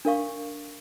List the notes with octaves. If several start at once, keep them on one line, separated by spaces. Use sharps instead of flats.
D4 A#4 F5 C#6